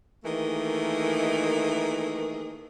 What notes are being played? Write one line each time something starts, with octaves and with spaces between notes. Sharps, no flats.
D#3 E3 A3 A#3 G#4